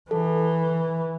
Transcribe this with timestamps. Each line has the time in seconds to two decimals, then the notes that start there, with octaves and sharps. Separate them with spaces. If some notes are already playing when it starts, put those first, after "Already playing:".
0.11 E3 A4